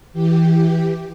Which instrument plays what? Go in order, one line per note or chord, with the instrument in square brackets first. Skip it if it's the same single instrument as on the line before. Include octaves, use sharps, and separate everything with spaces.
[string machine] E3 G4